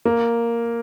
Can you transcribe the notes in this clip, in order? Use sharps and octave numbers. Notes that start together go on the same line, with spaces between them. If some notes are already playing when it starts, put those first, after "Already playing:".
A#3